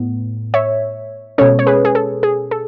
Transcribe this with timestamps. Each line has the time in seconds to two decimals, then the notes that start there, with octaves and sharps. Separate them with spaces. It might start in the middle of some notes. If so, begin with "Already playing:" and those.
Already playing: A2 B3
0.54 C#5 E5
1.38 B2 G#3 C#4 A4 C#5
1.59 C#5
1.67 G#4 B4
1.85 G#4
1.95 A4
2.23 G#4
2.51 A4